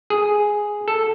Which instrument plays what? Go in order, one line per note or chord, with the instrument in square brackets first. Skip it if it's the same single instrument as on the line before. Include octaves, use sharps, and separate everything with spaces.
[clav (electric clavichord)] G#4
A4